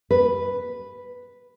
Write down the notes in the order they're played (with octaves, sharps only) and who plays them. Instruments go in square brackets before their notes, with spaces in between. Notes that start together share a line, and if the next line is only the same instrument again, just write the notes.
[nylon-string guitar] B4